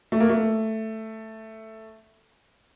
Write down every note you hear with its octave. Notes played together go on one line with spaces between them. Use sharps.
A3
A#3
A3